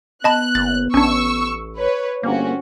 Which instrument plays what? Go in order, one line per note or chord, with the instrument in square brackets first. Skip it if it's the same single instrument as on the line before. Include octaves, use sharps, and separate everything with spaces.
[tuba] B3 [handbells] D#5 A5 B5 [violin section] F#6
[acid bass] F#1 [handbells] A6
[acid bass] A1 [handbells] C#4 D4 [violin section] C#6 E6
[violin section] B4 C#5
[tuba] G1 [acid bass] A#3 [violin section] C4 C#4 F#4